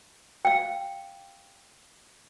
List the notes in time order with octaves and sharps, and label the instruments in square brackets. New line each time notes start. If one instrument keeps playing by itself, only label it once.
[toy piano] F5 G5